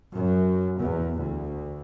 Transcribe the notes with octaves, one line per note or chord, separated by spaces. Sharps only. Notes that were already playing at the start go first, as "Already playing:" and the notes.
F#2
E2
D2